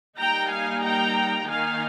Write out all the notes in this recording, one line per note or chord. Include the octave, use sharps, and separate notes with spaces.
G3 A#3 D#4 G5 A#5
F5 G#5
G5 A#5
D#3 A#3 D#4 F5 G#5